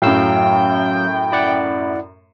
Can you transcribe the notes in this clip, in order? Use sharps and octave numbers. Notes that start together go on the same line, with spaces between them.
F#2 A2 F#3 F5 G5 E6
E4 D5 F#5